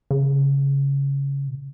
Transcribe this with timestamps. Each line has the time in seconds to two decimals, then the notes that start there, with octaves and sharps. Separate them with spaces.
0.11 C#3
1.48 B2